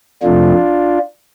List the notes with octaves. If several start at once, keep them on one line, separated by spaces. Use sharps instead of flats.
F2 C3 F3 A3 D4 F4